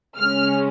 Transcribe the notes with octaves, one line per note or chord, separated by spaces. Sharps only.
C#3 G#3 C#4 F6